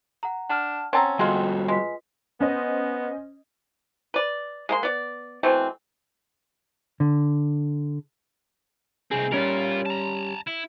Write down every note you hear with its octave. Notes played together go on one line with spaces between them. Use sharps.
F#5 A#5
D4 F#5 A5 F6
C4 C#4 F#5 G5 A5 A#5 E6
F2 G3 G#3 F4 F#4 G#4
G#3 F4 B4 B6
B3 C#4 C5 D#5
B4 D5
G#3 A#3 C6
B3 D5
B2 E3 A3 C4
D3
C2 C4 D#4 G#4
G3 C#4 F4 A#4
A5 A#5
E4